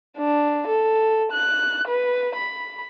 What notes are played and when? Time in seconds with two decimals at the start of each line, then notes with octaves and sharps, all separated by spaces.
0.18 D4
0.68 A4
1.32 F#6
1.88 B4
2.36 B5